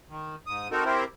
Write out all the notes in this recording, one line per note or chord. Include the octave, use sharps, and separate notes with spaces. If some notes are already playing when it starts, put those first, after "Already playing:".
D#3
G#2 D#6
C4 D#4 F#4 A4 A#4
C4 E4 G4 A#4 C5